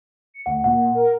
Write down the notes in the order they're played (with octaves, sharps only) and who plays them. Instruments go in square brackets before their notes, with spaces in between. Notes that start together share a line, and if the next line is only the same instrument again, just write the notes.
[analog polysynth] C#7
[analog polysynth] D2 [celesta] F#5
[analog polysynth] A#2 [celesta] F#5
[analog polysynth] A#4